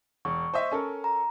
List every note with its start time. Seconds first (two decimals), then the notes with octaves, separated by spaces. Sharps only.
0.25 E1 C#6
0.54 C5 D#5 E5
0.71 C#4 A4 A#4
1.04 A#5